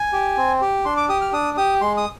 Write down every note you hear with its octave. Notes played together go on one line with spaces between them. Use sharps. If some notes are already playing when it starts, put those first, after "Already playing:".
Already playing: G#5
G4
C4
G4
D4 C6
D6
G4 D#6
F6
D4 D#6
G4 D#6
G#3 C6
D#6